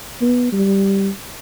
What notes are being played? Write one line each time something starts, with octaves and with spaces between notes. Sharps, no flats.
B3
G3